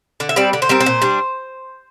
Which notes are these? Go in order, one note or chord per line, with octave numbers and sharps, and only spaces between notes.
D3 D5
E5
G3 C4 D5
D3 D5
C5
G3 C4 A#4
C5
A#2
G3 D4